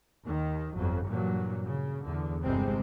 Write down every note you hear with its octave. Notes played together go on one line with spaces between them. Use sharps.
D#2 D#3
G1 F2 F#3
G2 A#2 E3 F#3
C#3
E2 D3
G1 C3 G3 G#3 C4